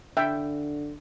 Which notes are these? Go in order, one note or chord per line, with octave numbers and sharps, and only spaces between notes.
D3 E5 G5